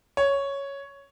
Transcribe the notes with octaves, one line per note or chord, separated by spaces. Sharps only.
C#5